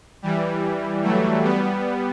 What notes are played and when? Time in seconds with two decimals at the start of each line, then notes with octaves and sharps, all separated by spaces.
0.22 E3 G3
1.03 F#3 A3
1.43 G3 B3